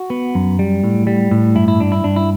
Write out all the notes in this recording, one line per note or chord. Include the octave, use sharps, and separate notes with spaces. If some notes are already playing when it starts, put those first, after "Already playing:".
Already playing: F#4
B3
F#2
G3
A2
G3
A2
G2 E4
E4
G2 D4
E4
G2 D4
E4